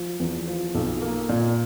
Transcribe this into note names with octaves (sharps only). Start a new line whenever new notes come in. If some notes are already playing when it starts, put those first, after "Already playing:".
Already playing: F3
E2
F3
B1
A#3
A#2